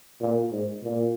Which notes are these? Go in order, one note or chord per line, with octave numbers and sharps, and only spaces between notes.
A#2
G#2
A#2